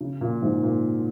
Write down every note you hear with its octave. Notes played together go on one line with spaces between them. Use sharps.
C#3
A#2
G#2
A#2